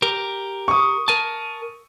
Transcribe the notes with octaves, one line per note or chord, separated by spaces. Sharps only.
G4 A#4
C#6 D#6
A#4 G#5 A5